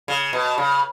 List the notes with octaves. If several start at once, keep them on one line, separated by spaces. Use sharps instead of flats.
C#3
B2
C#3